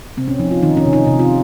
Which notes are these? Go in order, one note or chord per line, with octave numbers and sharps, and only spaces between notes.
C3 C4
C#4
F3 D#4
F4
D#3 D#4
C#4
C3
D#4
C3
F4